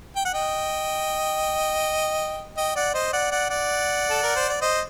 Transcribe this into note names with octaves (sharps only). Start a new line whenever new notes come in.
G5
F#5
D#5 G5
D#5 G5
D5 F#5
C5 D#5
D5 F#5
D5 F#5
D5 F#5
A4
A#4
C5
D5
C5 D#5